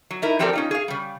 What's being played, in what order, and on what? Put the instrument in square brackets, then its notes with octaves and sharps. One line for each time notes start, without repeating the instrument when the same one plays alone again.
[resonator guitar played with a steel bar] F#3
D#4 E4 A#4
F3 C4 G4 A4 A#4 D5
C#4 D#4 F4
G#4 F5
C#3 G3